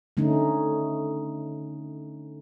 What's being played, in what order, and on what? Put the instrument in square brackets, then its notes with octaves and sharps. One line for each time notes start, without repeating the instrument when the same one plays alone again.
[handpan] D3 A3 C#4 D#4